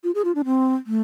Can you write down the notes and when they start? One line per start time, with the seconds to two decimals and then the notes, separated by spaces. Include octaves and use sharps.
0.04 F4
0.15 G#4
0.25 F4
0.35 D4
0.45 C4
0.87 A3